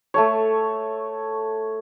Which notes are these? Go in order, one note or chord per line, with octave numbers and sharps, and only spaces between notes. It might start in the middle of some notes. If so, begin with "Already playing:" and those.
A3 A4 C#5